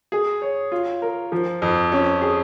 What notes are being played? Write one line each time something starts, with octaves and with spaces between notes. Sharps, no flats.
G#4
C#5
F4
A#4
F3
F2
C#4
G#4